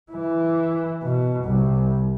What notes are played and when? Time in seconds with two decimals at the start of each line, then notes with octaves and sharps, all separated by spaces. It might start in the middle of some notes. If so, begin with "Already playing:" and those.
0.12 E3
1.03 B2
1.44 C2